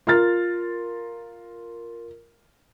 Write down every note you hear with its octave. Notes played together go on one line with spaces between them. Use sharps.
F4 A#4 F6 A6